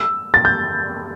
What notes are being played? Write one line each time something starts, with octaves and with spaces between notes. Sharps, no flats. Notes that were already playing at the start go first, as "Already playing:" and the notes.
Already playing: E6
A6
G6